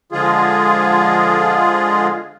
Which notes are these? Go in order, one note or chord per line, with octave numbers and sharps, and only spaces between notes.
D3 F3 G#3 F4 G#4